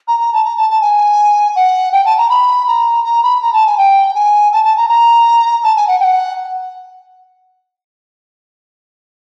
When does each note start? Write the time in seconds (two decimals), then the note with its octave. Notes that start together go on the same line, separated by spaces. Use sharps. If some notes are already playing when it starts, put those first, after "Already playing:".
0.07 A#5
0.19 A#5
0.33 A5
0.44 A#5
0.56 A5
0.70 A5
0.81 G#5
1.55 F#5
1.92 G5
2.05 A5
2.18 A#5
2.29 B5
2.67 A#5
3.04 A#5
3.23 B5
3.41 A#5
3.53 A5
3.66 G#5
3.77 G5
4.15 G#5
4.53 A5
4.64 A5
4.77 A#5
4.88 A#5
5.63 A5
5.76 G#5
5.87 F#5
6.00 G5
6.04 F#5